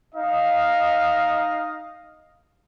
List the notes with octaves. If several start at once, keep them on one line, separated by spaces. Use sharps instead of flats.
D#4 D#5 F5